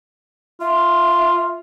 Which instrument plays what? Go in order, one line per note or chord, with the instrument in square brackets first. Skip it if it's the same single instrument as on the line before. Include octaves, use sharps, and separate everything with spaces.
[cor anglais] F4 [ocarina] E5